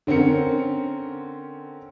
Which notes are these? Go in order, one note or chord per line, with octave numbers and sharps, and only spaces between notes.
D3 C4 C#4 A#4 C#7